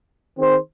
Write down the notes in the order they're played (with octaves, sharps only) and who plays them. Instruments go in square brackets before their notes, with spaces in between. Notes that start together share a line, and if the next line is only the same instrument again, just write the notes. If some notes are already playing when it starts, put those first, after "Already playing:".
[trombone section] D#3 C4 G#4 C5